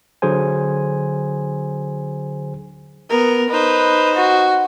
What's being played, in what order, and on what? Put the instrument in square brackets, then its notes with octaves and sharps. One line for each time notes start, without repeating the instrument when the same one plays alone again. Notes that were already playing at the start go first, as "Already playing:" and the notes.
[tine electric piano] D3 F#3 G#4 C5 G#5
[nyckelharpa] B3 A#4
[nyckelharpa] D#4 C5 [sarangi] B4
[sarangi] F#4